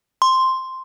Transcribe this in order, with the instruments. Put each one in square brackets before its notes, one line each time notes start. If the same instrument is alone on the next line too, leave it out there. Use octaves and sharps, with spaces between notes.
[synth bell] C6